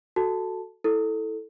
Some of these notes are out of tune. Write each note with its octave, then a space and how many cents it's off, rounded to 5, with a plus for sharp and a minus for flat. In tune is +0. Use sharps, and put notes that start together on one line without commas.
F#4 +0 A4 +0 A5 +0
E4 -10 A4 +0